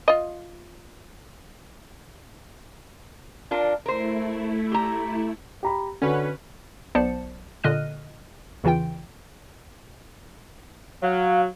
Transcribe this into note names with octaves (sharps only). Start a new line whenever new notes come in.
F4 D#5
D4 F4 A#4
A3 E4 A#4 C5
G4 A#5
G4 A#5 B5
D3 C#4 F#4 B4
B1 B3 C5 D5 A5 C#7
A#2 D3 D#5 F6 F#6 D#7
E2 C#3 E3 F4 G5
F#3 F5